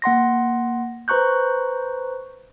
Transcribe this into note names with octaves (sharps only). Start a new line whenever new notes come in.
A#3 F#5 C6 A#6
B4 C5 A#5 C#6 F#6 G6